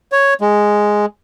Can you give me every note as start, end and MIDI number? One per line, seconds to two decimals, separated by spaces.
0.12 0.34 73
0.41 1.06 56